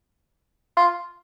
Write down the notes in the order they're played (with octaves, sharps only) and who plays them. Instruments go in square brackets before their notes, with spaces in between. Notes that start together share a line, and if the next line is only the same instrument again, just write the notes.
[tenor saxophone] F4